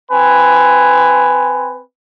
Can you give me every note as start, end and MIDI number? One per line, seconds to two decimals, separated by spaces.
0.11 1.80 60
0.11 1.80 71
0.11 1.80 80